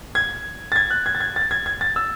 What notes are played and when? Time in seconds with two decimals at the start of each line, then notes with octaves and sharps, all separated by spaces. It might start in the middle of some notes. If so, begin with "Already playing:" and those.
0.15 G#6
0.72 A6
0.76 G#6
0.91 F#6
1.06 G#6
1.15 A6
1.21 G#6
1.36 A6
1.51 G#6
1.66 G#6
1.81 A6
1.96 E6